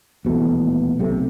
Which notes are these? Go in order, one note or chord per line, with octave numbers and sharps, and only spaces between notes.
D#1 B2 E3 A3
B1 C3 A3